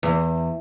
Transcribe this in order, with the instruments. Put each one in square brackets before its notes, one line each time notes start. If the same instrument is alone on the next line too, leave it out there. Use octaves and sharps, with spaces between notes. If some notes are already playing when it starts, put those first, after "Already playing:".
[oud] E2